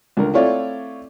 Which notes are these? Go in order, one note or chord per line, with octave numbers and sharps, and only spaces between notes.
C#2 D3 A#4
A3 C4 E4 F4 C#5 D5